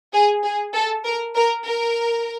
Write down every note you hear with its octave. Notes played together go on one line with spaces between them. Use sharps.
G#4
G#4
A4
A#4
A#4
A#4